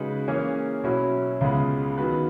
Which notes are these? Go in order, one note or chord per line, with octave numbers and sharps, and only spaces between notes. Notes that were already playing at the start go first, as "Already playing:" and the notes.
Already playing: C#3 G#3 D#4 F#4 B4
E3 A#3 C#4 G#4 C#5
B2 F#3 C#4 E4
C#2 C#3 G#3 B3
D#3 F#3 B3 F#4 B4